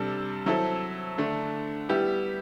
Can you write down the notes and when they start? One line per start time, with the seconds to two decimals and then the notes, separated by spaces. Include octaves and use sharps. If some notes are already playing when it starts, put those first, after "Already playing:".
Already playing: C3 G3 D4 A4
0.46 F#3 C4 E4 A4
1.18 D3 A3 D4
1.89 G3 B3 E4 G4